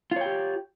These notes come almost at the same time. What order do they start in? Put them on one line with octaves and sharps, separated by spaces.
F4 C#5 G5 G4